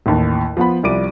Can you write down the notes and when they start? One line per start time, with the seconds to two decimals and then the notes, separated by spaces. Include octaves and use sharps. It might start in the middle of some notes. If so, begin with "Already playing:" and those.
0.06 A1 D#2 A5
0.57 F3 B3 F#5 B5
0.83 C2 F3 G3 D6 D7 D#7